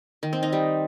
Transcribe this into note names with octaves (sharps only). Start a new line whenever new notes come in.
D#3
C4
D#4
G3